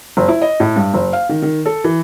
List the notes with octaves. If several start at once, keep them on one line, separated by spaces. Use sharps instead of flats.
F#1
E4
D#5
A2
G2
F#1
F5
D#3
D#3
A4
E3